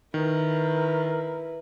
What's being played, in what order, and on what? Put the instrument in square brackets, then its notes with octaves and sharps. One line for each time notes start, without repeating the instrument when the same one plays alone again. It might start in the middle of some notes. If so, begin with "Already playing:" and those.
[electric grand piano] D#3 [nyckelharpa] E4 B4 [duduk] A#4